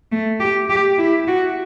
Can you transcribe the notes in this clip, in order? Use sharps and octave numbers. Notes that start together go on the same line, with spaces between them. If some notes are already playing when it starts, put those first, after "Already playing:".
A3
G4
G4
E4
F#4